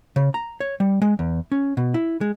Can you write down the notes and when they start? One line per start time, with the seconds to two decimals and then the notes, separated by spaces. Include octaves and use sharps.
0.16 C#3
0.34 A#5
0.60 C#5
0.80 G3
1.02 G#3
1.19 E2
1.52 C#4
1.77 B2
1.94 E4
2.21 G#3